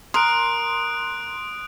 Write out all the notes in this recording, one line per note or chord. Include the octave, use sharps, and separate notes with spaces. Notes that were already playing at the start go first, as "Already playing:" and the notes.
A#4 C6 D#6 F#6 D7